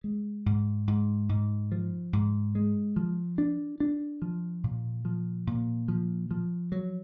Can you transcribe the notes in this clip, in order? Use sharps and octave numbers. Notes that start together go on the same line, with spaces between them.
G#3
G#2
G#2
G#2
F3
G#2
G#3
F3
D4
D4
F3
A#2
F3
A#2
F3
F3
F#3